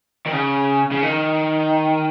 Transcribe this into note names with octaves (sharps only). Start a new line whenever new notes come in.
D#3
C#3
C#3
D#3